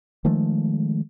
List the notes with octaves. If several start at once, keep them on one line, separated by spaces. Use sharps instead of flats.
D#3 F3 G#3 A3